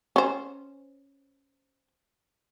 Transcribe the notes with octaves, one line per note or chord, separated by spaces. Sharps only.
C#4 C5